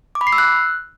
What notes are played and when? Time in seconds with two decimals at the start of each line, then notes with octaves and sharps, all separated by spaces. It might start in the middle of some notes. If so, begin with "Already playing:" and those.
0.15 D6
0.21 B5
0.27 C7
0.33 E6
0.38 F#6